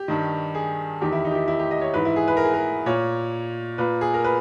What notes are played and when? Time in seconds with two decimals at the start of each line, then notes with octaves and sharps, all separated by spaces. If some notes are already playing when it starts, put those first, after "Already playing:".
Already playing: G4
0.08 G2 D#3
0.55 G#4
1.01 E2 D#3 G4
1.12 E4
1.25 D#4
1.31 G4
1.35 E4
1.48 E4
1.59 G4
1.71 D#5
1.81 C#5
1.94 G#2 E3 B4
2.05 E4
2.16 G#4
2.28 B4
2.37 A#4
2.44 G#4
2.54 A#4
2.86 A#2 C#5
3.78 A#2 B4
4.01 G#4
4.14 A#4
4.24 B4